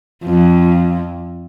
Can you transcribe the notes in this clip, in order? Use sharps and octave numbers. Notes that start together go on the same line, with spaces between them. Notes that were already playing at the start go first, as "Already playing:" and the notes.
F2